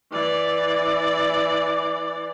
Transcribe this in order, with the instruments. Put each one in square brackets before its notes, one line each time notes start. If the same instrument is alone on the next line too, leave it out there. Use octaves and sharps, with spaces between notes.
[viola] E3 D5